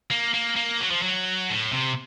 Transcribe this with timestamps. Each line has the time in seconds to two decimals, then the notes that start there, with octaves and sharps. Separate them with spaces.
0.11 A#3
0.34 A#3
0.56 A#3
0.80 F#3
0.91 F3
1.02 F#3
1.50 A2
1.72 C3